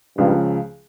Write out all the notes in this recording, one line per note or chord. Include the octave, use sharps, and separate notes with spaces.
C#2 G2 C#3 F3